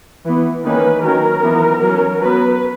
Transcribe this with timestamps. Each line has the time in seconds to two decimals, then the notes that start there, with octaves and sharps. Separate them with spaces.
0.25 E3 B3
0.64 D#3 A#3 C#4 B4
1.03 D#3 F#3 C#4 A#4
1.43 E3 B3
1.82 F#3 C#4
2.21 F#3 B3 B4